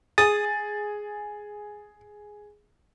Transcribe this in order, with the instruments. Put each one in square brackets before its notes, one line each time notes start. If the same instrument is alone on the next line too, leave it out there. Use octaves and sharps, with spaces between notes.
[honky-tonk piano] G#4 [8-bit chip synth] D#6 [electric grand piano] A6